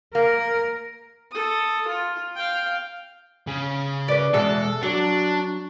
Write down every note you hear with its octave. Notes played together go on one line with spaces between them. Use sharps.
A#3 A#4
A4 D#6
F4
F5 G5
C#3
B4 D5
E2 B2 G#3 A4
F#3 D4